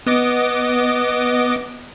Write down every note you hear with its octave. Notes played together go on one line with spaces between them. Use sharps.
B3 D#5 D6